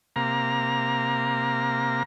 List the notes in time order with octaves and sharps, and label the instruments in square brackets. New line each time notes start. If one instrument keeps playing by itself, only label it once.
[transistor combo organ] C3 A#3 A#5 F6